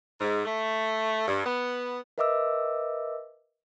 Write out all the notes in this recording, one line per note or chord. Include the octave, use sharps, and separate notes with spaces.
G#2
A3
G2
B3
A#4 B4 D#5 E5 D6 E6